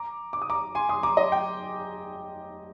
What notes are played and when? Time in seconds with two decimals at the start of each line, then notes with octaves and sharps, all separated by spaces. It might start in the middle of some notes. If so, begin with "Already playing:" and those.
Already playing: A#5 D6
0.33 D6
0.42 D#6
0.50 A#5 D6
0.75 G#5 C6
0.89 C6 D#6
1.03 A#5 D6
1.17 D#5
1.32 G5